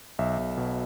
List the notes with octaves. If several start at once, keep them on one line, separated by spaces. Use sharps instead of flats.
B1 E5
B1
B2